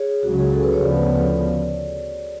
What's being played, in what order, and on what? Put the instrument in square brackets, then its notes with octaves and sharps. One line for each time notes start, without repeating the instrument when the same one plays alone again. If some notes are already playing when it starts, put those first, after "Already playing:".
Already playing: [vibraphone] G#4 C#5
[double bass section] C#2 C#3 F#3 [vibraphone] F#4
[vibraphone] G#4
A4
B4
C#5
[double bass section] D2 C#3 F3 B3 [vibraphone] D5